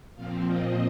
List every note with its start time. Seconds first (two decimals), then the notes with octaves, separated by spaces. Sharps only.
0.15 A#2 F3 C4 F5
0.46 D#5